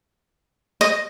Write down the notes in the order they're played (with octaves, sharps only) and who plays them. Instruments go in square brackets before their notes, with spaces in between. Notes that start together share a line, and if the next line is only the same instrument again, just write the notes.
[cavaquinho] D#5